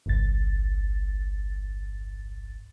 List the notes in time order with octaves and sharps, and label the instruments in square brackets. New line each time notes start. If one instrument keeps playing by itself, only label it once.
[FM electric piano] G1 C2 G2 A6